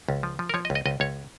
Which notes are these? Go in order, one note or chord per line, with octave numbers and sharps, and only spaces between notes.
C#2
F3
F3
A#4
F3 C#5
D#5
C#2
D#5
C#2 D#5
C#2 C#5